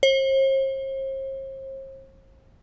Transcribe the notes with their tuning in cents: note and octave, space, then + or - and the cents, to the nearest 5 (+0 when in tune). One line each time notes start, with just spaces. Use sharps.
C5 +45